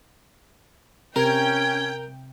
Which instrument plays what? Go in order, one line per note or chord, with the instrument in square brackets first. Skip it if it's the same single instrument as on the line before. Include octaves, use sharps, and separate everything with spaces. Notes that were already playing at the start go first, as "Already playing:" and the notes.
[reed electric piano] C3 [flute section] C#4 G#6 [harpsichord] A#4 [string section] G5